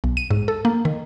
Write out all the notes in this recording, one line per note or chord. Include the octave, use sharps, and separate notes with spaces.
B1
D#7
G#2
A4
A#3
D#3